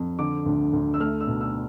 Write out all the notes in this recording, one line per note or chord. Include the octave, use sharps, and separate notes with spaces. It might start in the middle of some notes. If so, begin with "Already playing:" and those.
Already playing: F2
D3 D6
D2
D2
E6
A3 F6
E6
B2
E6